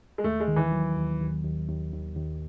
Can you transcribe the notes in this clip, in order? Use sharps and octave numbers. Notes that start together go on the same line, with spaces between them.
G#3
D#2 A3
G#3
D#3
E3
F#3
D#2
D#2
D#2
D#2
D#2
D#2